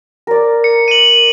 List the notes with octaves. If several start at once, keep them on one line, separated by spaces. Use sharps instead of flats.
A#4 D5
C#7
D#7 F#7